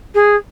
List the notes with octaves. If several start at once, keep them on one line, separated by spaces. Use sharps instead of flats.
G#4